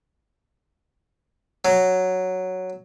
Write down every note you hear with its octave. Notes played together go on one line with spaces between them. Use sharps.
F#3